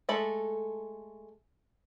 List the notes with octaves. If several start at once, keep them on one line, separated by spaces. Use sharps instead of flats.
G#3 A3 A4 B5